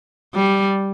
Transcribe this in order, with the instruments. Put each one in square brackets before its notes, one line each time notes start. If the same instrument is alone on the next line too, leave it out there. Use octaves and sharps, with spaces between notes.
[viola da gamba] G3